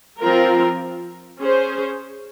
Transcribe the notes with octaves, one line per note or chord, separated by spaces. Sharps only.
F3 C4 F4 A#4
C#4 G#4 C5